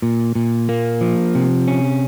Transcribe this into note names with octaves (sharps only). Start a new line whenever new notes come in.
A#2
A#2
A#3
F3
C3
C#4